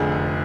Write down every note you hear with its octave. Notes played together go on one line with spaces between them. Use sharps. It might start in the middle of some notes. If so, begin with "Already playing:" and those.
Already playing: F1 F2 D3 G#4